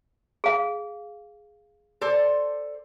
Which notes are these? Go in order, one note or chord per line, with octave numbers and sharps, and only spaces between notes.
G#4 F5
A4 C5 D5